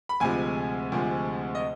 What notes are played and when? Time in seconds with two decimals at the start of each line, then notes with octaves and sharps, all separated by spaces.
0.09 B5
0.20 D2 C3 F3 G#3 G#5
0.92 D2 C3 F3 G#3
1.55 D#5